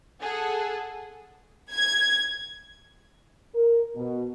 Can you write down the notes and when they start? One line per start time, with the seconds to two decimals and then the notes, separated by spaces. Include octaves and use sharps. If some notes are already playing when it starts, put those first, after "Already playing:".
0.21 G#4 A4 F#5
1.72 G#6
3.55 A#4
3.96 B2